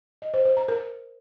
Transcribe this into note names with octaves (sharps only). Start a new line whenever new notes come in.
D#5
C5
C5
A#5
A#4